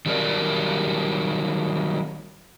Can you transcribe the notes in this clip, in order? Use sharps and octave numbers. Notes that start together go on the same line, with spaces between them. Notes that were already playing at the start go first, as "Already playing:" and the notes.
D#3 F#3 G3 D#4 A#4 D5